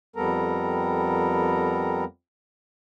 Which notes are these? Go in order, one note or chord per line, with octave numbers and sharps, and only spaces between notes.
F2 G3 B3 A4 A#4 A#5